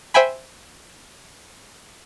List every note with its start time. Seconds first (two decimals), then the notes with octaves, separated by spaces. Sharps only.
0.14 C5 E5 G5 G#5 B5